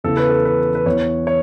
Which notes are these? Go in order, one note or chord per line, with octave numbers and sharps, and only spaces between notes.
E2 C#3 E3 A4
B4
A4
B4
B4
E2 E3 C#5
C#5